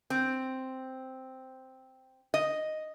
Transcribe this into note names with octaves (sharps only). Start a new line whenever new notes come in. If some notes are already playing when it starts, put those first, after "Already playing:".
C4
D#5